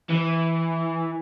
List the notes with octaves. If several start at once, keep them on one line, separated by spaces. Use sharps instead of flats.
E3